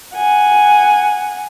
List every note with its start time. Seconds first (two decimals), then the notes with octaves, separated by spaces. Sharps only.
0.16 F#5 G#5